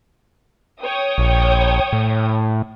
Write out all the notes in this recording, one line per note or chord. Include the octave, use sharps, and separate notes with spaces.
C#5 G5 D#6
A#1
A2